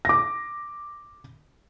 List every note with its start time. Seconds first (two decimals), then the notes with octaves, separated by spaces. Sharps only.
0.05 D6 A#6